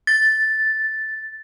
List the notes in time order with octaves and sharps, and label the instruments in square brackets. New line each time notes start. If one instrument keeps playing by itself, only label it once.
[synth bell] A6